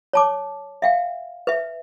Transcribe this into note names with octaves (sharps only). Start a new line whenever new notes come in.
C#5 A5 D6
E5 F5 G5
B4 E5